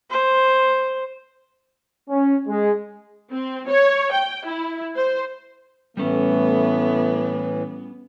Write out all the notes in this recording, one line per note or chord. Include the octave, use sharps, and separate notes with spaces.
C5
C#4
G#3
C4
C#5
G5
E4
C5
A2 E3 G3 A3 B3 C#4 E4